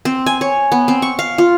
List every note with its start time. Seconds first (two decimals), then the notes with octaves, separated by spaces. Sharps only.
0.05 C4
0.26 G#5
0.41 C#5
0.72 B3
0.88 C4
1.02 C#6
1.19 F5
1.38 F4